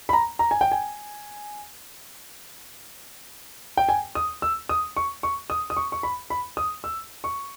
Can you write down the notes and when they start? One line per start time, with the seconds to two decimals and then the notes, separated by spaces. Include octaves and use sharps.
0.09 B5
0.13 A#5
0.39 A#5
0.51 G#5
0.61 G5
0.72 G#5
3.77 G5
3.89 G#5
4.15 D#6
4.42 E6
4.69 D#6
4.97 C#6
5.23 C#6
5.50 D#6
5.70 D#6
5.77 C#6
5.92 C#6
6.03 B5
6.30 B5
6.57 D#6
6.84 E6
7.24 C#6